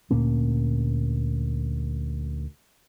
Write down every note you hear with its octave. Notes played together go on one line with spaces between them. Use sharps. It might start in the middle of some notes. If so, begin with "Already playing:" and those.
D2 A#2 A#3 C#4